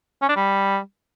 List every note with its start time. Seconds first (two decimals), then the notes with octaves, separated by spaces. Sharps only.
0.22 C#4
0.29 D4
0.36 G3